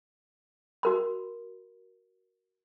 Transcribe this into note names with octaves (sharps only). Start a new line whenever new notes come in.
F#4 A#4 B5